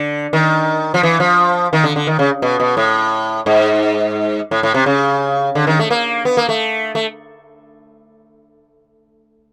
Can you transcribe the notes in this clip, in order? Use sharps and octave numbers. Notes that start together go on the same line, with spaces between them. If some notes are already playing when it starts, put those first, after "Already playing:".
Already playing: D3
D#3
F3
E3
F3
D#3
D3
D3
D#3
C#3
B2
B2
A2
G#2
A2
A2
C3
C#3
D3
D#3
A3
A#3
B3
A#3
A3
A3